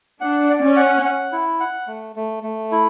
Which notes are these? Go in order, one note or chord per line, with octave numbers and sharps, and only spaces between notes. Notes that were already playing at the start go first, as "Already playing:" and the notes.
D4 F#5
D5
C#4
F#5
F#5
E4
F#5
A3
A3
A3
E4